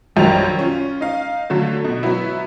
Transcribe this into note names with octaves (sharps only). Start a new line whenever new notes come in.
A#1 F#2 D#3 G3 F7
C#4 F4
D#4 F5
D3 F#3 A3
B2
F#3 B3 E4